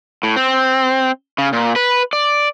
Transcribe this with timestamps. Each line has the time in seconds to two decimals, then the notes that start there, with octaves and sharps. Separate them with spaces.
0.23 A2
0.36 C4
1.38 C#3
1.53 A#2
1.76 B4
2.13 D5